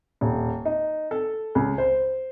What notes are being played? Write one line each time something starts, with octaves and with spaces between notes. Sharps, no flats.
D#1
D#4
A4
C#2
C5